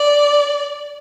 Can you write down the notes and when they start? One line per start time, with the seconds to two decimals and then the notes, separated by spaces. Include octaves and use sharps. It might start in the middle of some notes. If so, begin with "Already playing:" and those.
Already playing: D5